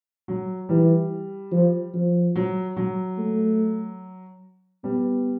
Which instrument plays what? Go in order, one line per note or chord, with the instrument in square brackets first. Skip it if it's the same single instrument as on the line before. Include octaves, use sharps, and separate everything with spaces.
[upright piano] F#3
[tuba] E3 [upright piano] G3
[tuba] F3
F3
[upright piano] F#3
F#3
[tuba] A3
[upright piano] G3 [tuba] B3